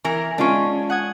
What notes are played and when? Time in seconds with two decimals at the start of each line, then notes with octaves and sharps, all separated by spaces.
0.04 E3 A#4
0.38 G#3 C#4 D4 F4
0.90 F#5 D#6 G#6